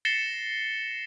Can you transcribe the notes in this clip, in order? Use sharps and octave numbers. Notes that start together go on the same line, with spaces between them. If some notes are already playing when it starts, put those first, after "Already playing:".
A6 A#6 C7 C#7 E7 G7